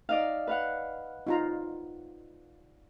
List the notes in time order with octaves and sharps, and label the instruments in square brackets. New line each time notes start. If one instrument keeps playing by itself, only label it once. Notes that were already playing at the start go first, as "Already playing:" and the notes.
[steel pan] D#4 [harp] D5 D#5 F5
[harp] B4 F5 F#5
[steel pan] D#4 F4 A#5